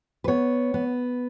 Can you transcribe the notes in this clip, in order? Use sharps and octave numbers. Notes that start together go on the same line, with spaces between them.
B4
B3 C#5
B3